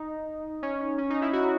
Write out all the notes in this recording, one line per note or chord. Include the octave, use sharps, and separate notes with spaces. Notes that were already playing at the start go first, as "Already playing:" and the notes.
Already playing: D#4
C#4
C#4
C#4
D#4
E4
F#4